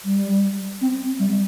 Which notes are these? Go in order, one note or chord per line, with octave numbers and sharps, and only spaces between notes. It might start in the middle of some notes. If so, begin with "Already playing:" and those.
G3
C4
G3